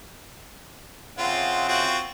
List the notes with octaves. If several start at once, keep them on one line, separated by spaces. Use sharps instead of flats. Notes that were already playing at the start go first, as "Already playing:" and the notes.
C#3 C4 F4 E5 F#5
C4 F4 F#4